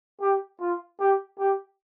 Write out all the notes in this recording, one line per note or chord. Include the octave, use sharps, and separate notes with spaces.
G4
F4
G4
G4